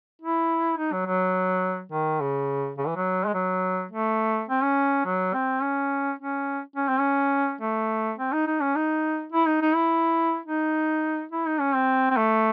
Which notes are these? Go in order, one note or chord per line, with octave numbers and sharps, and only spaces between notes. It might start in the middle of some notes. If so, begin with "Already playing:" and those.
E4
D#4
F#3
F#3
D#3
C#3
C#3
E3
F#3
G#3
F#3
A3
C4
C#4
F#3
C4
C#4
C#4
C#4
C4
C#4
A3
C4
D#4
D#4
C#4
D#4
E4
D#4
D#4
E4
D#4
E4
D#4
C#4
C4
C4
A3